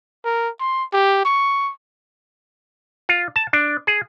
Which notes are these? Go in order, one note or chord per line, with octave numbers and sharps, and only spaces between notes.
A#4
C6
G4
C#6
F4
A5
D4
G#4